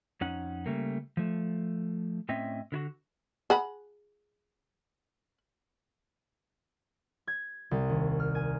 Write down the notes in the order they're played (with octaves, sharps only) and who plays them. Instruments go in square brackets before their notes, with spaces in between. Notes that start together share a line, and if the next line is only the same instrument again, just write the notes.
[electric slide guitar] F2 C#4 D#4 F#5
C#3 G3 A3 A#3
F3 A3
A2 C4 C#4 D#5 E5
D3 E4 F#4
[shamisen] G#4 F#5 B5
[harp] G#6
C2
D#2
F6
G#5